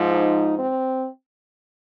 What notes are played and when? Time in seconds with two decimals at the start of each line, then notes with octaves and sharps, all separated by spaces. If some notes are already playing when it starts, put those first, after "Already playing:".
Already playing: G#2 F3
0.12 D#4
0.59 C4